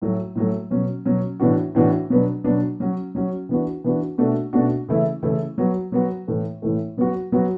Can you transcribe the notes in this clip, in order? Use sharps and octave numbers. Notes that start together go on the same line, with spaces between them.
A2 F#3 A3
A2 F#3 A3
B2 F#3 C#4
B2 F#3 C#4
A2 E3 B3 D4 F#4
A2 E3 B3 D4 F#4
B2 F#3 B3 D4
B2 F#3 B3 D4
F#3 C#4 F#4
F#3 C#4 F#4
E3 B3 D4 F#4
E3 B3 D4 F#4
B2 A3 D4 F#4
B2 A3 D4 F#4
C#3 E3 A3 E4
C#3 E3 A3 E4
F#3 B3 F#4
F#3 B3 F#4
A2 E3 A3
A2 E3 A3
F#3 B3 F#4
F#3 B3 F#4